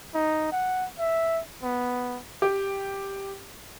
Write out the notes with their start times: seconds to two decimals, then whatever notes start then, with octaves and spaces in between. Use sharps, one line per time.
0.14 D#4
0.52 F#5
0.99 E5
1.63 B3
2.42 G4